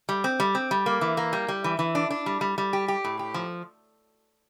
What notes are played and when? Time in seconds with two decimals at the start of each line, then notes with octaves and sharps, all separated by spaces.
0.09 G3
0.24 C4
0.40 G3
0.55 C4
0.71 G3
0.86 A#3
1.01 E3
1.17 A#3
1.33 G3
1.48 G3
1.64 E3
1.79 E3
1.95 D4
2.10 D4
2.26 G3
2.41 G3
2.58 G3
2.73 G4
2.88 G4
3.04 A2
3.19 G4
3.34 F3